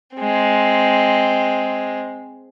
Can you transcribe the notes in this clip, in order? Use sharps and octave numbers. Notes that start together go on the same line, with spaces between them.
G#3 C4